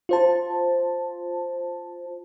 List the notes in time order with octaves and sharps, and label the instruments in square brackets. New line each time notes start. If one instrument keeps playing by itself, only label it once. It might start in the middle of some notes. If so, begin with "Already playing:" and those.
[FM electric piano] F4 C5 A5